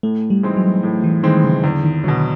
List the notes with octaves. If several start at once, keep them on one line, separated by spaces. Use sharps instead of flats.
A2 A3
G3
E3 G#3 C4 D#4
F#3
A2
E3
D#3 E3 G#3 C4 D#4
C#3
E2 D3
D#3
B2 D3 F#3